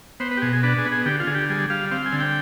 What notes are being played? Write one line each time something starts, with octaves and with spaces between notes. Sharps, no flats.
B3 C5
B4
G4
B2 G#4
G#4
D4 B4
G#4
B3
G#4
D3 G4
F4
D3 G#4
G4
G3 G#4
G3 F5
C4 F5
G#5
D3
G5